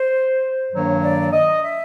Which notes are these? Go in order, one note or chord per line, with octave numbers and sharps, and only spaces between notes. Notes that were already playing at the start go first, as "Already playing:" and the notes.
Already playing: C5
G2 D#3 F#3 A#3 C#5
D5
D#5
E5